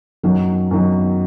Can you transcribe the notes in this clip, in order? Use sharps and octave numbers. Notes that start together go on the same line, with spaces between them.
F#2 D#3 F#3
F#2 D#3 F#3